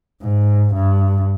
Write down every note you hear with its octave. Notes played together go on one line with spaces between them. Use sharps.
G#2
G2